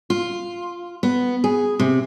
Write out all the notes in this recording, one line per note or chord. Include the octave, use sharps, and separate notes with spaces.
F4
B3
G#4
C3